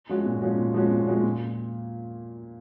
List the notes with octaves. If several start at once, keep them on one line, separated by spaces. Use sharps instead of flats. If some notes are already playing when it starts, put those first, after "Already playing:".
F3 G#3 C#4 F#4
A#2
F3 G#3 C#4 F#4
A#2
F3 G#3 C#4 F#4
A#2
F3 G#3 C#4 F#4
A#2